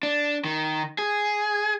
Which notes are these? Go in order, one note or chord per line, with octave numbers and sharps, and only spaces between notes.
D4
D#3
G#4